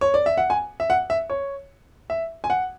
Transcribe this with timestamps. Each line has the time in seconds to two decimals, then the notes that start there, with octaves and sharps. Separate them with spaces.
0.01 C#5
0.14 D5
0.26 E5
0.38 F#5
0.50 G#5
0.80 E5
0.90 F#5
1.10 E5
1.30 C#5
2.10 E5
2.44 G#5
2.50 F#5